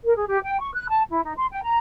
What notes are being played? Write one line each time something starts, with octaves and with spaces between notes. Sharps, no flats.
A#4
G#4
G4
G5
C#6
F#6
A5
E4
D#4
C6
G5
A#5